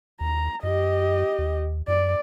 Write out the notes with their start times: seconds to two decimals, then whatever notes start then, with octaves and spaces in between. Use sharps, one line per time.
0.21 D#2 A#5
0.63 F#2 G4 D#5
1.39 D#2
1.88 F#2 D5